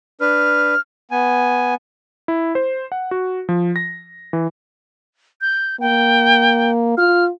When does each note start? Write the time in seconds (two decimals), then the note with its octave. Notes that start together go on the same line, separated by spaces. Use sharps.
0.21 D4 B4 F6
1.11 B3 G#5
2.28 E4
2.55 C5
2.92 F#5
3.11 F#4
3.49 F3
3.76 A#6
4.33 E3
5.41 G6
5.80 A#3 G5
6.97 F4 F6